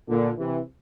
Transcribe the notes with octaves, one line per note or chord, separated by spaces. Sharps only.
A#2 D3
C3 E3